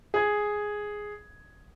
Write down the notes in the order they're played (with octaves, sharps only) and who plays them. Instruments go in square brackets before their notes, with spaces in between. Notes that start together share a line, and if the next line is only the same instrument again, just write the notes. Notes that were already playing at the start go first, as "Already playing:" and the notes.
[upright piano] G#4 G#6